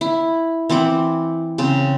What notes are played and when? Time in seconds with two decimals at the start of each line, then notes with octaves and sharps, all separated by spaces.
0.01 E4
0.69 E3 C4 F#5 D6
1.58 C#3 C4